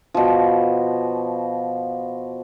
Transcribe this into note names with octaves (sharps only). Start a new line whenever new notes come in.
B2 F3